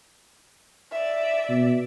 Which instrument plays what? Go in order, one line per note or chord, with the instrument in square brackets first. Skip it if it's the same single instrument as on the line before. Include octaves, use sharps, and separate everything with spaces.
[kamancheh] D5 E5
[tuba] B2